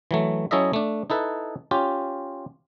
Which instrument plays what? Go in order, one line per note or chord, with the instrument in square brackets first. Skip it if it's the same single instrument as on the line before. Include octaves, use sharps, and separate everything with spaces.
[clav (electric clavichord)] E3 F#3 A3
F#3 C#4 E4 A4 D#5 E5
A3 D4
D#4 E4 A4 B4
C#4 F4 G4